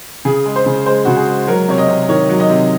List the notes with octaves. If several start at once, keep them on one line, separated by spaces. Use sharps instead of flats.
C#3 G#4
G#3
C5
C#3
G#3 C5
C#3 F#4
G#4
G#3
F#3 A#4
C3 C#5
D#5
C3
D#3 C#5
F#3
D#5
C3